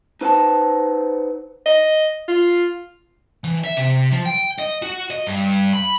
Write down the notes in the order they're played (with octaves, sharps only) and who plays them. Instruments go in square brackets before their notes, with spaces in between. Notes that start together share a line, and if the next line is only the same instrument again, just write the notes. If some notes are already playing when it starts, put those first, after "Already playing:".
[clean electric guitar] D#4 B4 C5 F5 F#5 A5
[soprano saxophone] D#5
F4
[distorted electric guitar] E3
E5
C3
F3
G5
D#5
F#4
D#5
G2
B5